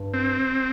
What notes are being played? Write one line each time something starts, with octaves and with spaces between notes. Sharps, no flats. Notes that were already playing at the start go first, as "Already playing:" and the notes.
Already playing: G2
C4